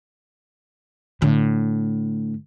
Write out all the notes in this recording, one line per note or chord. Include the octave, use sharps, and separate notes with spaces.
A2 D3